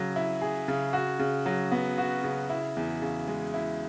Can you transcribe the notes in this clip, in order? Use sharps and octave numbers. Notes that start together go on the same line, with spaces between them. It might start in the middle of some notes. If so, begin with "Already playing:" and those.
Already playing: C#3 F#3
E4
G#4
C#3
F#4
C#3
F#3
B3
F#4
C#3
E4
E2
C#3
G#3
E4